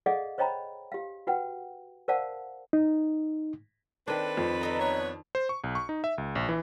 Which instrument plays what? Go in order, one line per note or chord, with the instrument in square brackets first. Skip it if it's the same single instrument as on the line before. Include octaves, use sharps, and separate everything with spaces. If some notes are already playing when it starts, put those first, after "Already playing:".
[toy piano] G#4 A4 D5 D#5 F5 F#5
C5 C#5 D#5 G5 A#5 B5
G4 F5
F#4 B4 F#5 G5
A#4 C5 D5 F5 F#5 A5
[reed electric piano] D#4
[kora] D#3 D4 [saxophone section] C4 A4 B4
[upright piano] F2
[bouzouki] D3 D#4 A#5
[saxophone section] B3 B4 C#5
[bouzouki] D4
[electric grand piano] C5
C#6
B1
C#6
D#4
E5
C#2
A#1
E3